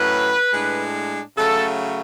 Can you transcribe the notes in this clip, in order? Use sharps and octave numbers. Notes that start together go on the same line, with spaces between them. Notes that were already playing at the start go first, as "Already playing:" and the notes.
Already playing: A2 F#3 C#4 B4
A2 G#3 D4
C#3 F#3 A3 A4